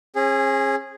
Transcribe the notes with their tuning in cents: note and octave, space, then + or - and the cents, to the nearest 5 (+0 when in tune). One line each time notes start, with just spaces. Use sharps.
C#4 -40 G#4 -10